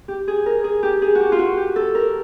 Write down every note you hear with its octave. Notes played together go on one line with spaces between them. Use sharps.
G4
G#4
A#4
G#4
G4
G#4
F#4
G4
F4
F#4
G4
A4
A#4